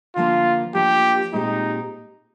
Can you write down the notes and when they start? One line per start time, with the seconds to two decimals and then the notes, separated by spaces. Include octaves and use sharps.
0.16 D3 F3 A#3 F4
0.75 F3 A#3 D4 F4 G4
1.33 A#2 G#3 C4 D#4 G4